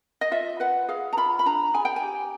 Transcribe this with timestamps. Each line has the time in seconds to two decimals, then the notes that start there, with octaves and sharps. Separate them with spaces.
0.21 D#5
0.31 F4 E5
0.60 B4 F#5
0.89 G#4 F5
1.13 A#5
1.17 F4 B5
1.39 B5
1.46 D4 A#5
1.74 G#4 G#5
1.85 G5
1.96 G#5
2.02 G4